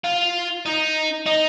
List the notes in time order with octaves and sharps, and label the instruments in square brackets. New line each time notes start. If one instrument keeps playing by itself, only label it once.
[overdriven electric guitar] F4
D#4
D#4